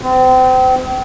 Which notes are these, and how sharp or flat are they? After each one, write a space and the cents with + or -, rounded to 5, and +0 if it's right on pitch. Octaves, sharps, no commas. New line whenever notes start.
C4 -35